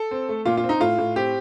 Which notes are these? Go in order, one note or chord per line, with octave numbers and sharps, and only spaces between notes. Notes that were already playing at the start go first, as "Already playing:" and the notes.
Already playing: A4
C4
A3
A#2 F4
F4
C4
D#4
A2 F4
A2
C4 G4